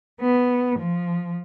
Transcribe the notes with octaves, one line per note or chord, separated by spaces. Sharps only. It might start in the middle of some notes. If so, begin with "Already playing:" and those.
B3
F3